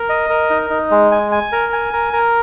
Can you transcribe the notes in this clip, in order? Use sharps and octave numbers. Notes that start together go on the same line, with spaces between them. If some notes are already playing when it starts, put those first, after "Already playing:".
Already playing: A#4
D#5
A#4
D#4
D#4
G#3
G#5
G#5
A#4
G#5
A#4
A#4